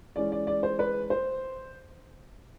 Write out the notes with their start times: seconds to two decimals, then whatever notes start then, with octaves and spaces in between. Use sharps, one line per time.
0.16 E3 G#3 C#4 D5
0.32 D5
0.47 D5
0.63 C5
0.79 B4
1.10 C5